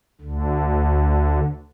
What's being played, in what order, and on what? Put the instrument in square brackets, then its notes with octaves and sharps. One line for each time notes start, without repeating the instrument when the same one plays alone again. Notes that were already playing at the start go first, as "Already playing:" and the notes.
[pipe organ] D2 D3